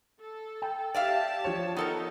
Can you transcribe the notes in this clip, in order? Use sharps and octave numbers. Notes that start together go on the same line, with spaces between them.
A4
G5
G4 D5 E5 F5 A5
F3 C#5
B3 D#4 A4 A#4